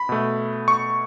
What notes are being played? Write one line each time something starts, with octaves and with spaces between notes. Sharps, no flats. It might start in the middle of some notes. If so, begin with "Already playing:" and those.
Already playing: B5
B2 A3
C#6